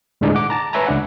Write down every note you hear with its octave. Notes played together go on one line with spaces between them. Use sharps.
D#2 A2 D3 G#3 D4 D#4
F#5 D6
A5 A#5
B4 C#5 E5 G#5 A#5
C#2 D4 F#5